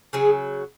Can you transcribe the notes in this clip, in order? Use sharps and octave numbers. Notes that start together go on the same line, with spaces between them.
C#3 F#3 G#4